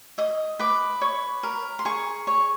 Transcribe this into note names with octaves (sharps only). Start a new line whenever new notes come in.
D#5 D#6
B4 D6
C#5
A#4
C6
G#4 C#6
C#5